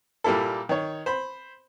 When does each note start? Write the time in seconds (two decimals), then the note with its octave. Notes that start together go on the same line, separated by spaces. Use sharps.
0.24 A#2 G3 A#3 E4 A4
0.69 D#3 C#5
1.06 C5 B5